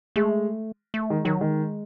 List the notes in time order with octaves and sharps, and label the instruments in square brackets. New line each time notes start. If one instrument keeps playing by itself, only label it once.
[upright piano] G#3 [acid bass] A3
[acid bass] A3
[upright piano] D#3 [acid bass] G#3
[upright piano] D#3 [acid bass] F#3
[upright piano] D#3 [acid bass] G#3